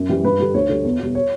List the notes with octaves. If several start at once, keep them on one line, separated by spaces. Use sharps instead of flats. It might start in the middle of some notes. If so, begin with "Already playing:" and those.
Already playing: F#2
E3 G3
G2 B4
D3 G3
D2 C#5
D3 G3
E2
B2 G3
C#5